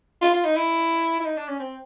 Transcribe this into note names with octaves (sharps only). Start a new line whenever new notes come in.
F4
F4
D#4
E4
E4
D#4
D4
C#4
C4